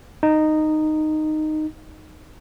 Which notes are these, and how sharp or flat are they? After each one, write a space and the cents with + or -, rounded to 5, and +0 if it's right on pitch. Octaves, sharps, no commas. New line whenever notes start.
D#4 -10